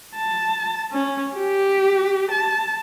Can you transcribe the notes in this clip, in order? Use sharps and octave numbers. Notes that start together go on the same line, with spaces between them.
A5
C#4
G4
A5